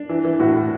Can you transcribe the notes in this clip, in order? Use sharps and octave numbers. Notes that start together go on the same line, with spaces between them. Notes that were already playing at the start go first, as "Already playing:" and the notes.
Already playing: D4
E3
E3
A2 F#4
A2